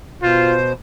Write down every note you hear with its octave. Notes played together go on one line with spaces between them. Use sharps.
B2 F4 C5